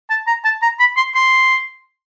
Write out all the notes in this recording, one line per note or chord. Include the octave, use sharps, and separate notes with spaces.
A5
A#5
A5
A#5
B5
C6
C6